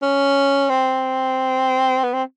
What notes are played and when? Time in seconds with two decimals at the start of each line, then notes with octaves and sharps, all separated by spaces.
0.02 C#4
0.69 C4
2.04 B3
2.14 C4